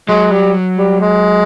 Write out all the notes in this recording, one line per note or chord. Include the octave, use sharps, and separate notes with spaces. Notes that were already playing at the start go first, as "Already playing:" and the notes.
F#3 G#3
G3
G3
G#3